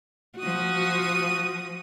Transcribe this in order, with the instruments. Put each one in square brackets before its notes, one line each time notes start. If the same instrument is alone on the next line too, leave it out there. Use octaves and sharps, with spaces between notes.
[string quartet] F3 D#6 [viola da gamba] F#4